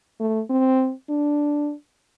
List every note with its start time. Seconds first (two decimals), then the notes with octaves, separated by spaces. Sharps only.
0.20 A3
0.50 C4
1.10 D4